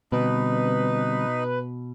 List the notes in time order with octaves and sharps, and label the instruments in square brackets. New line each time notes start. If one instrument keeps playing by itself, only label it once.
[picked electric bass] B2 [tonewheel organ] D3 G3 C4 [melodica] D#4 [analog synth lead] B4